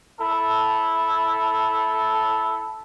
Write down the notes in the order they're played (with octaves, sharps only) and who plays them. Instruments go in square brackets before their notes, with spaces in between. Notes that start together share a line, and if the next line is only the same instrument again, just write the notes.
[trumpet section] E4 A4